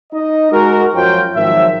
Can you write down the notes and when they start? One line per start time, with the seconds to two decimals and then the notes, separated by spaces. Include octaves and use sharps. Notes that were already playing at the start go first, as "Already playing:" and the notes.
0.13 D#4 D#5
0.52 G#3 F#4 A#4
0.95 F#2 F3 F#3 F4 C#5 G5
1.36 G#1 G#2 D#3 F3 F#3 E5